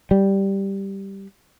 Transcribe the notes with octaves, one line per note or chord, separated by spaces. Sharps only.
G3